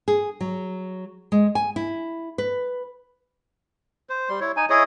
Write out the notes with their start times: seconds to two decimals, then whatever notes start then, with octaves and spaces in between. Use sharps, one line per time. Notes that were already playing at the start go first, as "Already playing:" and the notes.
0.08 G#4
0.41 F#3
1.32 G#3
1.55 G#5
1.76 E4
2.38 B4
4.09 C5
4.29 G3 C6
4.41 E4 C#5
4.57 D#4 G#5
4.70 E4 G#4 C#5 D#5